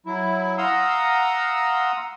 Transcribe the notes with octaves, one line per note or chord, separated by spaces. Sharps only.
F#3 E4
F5 F#5 A#5 C6 D#6 E6